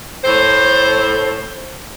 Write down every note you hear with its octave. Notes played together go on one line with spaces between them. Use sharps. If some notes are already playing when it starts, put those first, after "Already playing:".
A2 A4 C5